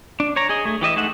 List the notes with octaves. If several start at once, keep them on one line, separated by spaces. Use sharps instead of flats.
D4
C#5 A#5
G#4 D#5
A3 G#4
E3 G4 D#5 E5
G#3 A3 D#4 E5 F#5